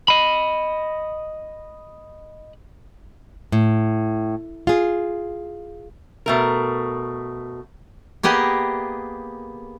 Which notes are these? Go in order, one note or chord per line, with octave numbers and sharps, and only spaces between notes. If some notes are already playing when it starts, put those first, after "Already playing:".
D#5 B5
A2
F4 G#4
B2 A3 A#4
A#3 B3 G4 G#4 D#5